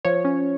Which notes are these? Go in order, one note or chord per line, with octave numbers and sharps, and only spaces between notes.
F3 C#5
C#4